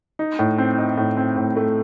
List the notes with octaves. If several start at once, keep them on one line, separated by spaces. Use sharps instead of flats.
D#4
A2
C4
D#4
A2
C4
A2
A3